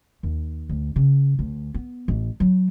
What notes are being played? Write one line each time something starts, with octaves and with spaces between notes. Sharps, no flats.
D#2
D2
C#3
D2
B3
A1
F#3